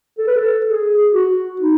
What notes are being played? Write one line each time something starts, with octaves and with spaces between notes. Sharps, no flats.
A4
B4
A4
G#4
F#4
D#4